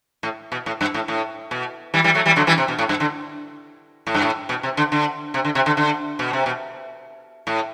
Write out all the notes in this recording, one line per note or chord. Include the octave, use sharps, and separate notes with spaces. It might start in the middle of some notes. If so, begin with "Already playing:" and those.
A2
B2
A2
G2
A2
A2
B2
E3 G3
E3 G3
F#3 A3
E3 G3
D3 F#3
E3 G3
C3
B2
A2
G2
D3
A2
G2
A2
B2
C3
D3
D3
C3
D3
C3
D3
D3
B2
C3
B2
A2